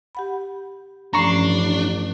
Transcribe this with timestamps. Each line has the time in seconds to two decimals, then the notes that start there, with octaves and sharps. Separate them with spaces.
0.15 G4 F#5 B5
1.14 A1 G2 F3 C#4 D4 A#5 C#6 C7